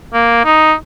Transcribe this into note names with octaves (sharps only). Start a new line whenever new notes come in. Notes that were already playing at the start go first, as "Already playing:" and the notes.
A#3
D#4